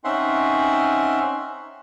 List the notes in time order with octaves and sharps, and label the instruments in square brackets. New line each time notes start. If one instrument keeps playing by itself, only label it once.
[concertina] C4 C#4 D#4 E5 F#5 C6